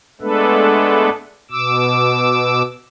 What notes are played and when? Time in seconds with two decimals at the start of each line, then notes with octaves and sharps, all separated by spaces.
0.21 G#3 A3 B3 D4 A4 B4
1.51 B2 D6 E6